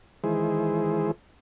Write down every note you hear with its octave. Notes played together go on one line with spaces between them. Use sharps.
D#3 E3 G#3 E4 G#4 C5